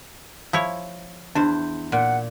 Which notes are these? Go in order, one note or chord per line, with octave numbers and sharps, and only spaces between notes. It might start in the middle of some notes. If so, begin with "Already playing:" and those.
F3 E4 C#5
E2 D4 C5
A#2 F#5